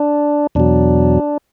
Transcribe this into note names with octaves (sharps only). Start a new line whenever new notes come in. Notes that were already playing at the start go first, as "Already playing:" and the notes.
Already playing: D4
E2 B2 F#3 D4